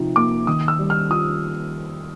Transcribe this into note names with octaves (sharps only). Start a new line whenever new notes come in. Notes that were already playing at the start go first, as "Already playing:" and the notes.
Already playing: C3 F3 D#4
A#3 D6
D#3 D#6
E6
G3
F6
F4 D#6